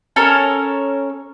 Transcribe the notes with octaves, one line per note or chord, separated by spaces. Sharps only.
C#4 A4 A#4 C#5